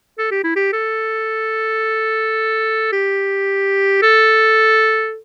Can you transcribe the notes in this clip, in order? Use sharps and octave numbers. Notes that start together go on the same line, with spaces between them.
A4
G4
E4
G4
A4
G4
A4